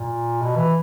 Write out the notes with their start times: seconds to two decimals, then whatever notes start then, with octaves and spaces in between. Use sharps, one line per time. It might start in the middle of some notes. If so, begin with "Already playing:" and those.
Already playing: A#2
0.42 B2
0.56 E3